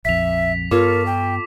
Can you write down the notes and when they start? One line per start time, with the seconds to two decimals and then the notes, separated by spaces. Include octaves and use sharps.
0.05 A#1 F2 E5 B6 F7
0.71 G2 B3 F4 A4 A#4 C#5 D6
1.06 G5